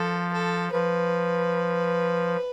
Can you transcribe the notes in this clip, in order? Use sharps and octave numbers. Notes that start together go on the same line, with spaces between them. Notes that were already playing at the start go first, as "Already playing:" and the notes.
Already playing: F3 A4
A4
F3 B4